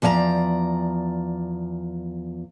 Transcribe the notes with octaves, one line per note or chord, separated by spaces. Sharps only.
E2 F3 D5 G#5 A#5